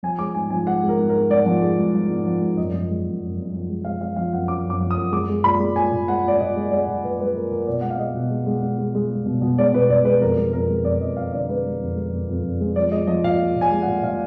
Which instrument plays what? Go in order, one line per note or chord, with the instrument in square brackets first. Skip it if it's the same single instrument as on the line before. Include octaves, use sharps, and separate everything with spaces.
[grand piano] F3 G#5
G#3 D6
G#2 G#5
F3 G#5
G#3 F#5
G#3
A#4
G#2
A#4
G#3
G#2 D5
F3
G#3
G#2
F3
G#2
F3
G#2
F#2 D#5
F3
G#3
F#2
F#2
F#2
F3
G#3
G#3 F5
G#3 F5
F3 F5
F#2 F#5
F#2 D6
F#2
D6
F3
D#6
F#2
G#3 D6
G#3
A#2 B5
G#3
A#2 G#5
A#2
G#3 F#5
A#2 D5
A#2 D#5
G#3
G#3 D5
A#2
A#2 B4
G#3 B4
A#2 A#4
A#2 A#4
B2 D5
G#3 F#5
F5
G#3 D#5
B2
G#3
G#3
G#3
G#3
G#3
G#3
B2
B2
G#3 D5
B2 B4
B2 D5
G#3 B4
F2 A#4
G#3
F2 A#4
G#3
F2 D5
F2 D#5
F2 F5
D3 D5
G#3 B4
G#3
F2
G#3
F2
F2
F2
G#3
F3 D5
G#3 D#5
F3 D#5
A#2 F5
A#2
A#2
G#5
G#3
F#5
A#2
A#2 F5